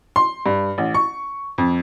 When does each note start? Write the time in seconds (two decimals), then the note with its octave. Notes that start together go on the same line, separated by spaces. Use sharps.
0.16 C6
0.46 G2
0.78 A1
0.94 C#6
1.58 F2